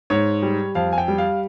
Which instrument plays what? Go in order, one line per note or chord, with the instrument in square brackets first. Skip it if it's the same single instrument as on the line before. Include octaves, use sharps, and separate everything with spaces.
[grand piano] G#2 C#5
G3
F2 F5
G#5
G5
G3
F5